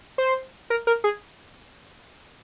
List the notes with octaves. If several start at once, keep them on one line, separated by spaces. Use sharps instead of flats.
C5
A#4
A#4
G#4